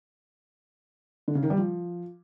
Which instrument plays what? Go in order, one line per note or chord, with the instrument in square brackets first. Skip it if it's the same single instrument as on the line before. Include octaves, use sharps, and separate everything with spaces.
[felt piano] D3
C#3
D#3
G3
F3